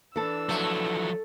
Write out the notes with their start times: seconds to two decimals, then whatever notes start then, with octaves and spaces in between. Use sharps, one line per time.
0.16 E3 D4 A4 E6
0.49 F3 F#3 A3